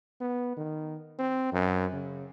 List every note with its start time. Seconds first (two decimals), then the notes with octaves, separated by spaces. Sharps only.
0.21 B3
0.57 D#3
1.19 C4
1.52 F#2
1.93 C#3